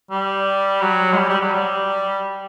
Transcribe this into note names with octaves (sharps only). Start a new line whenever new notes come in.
G3
F#3
G#3
G3
G3
F#3
G3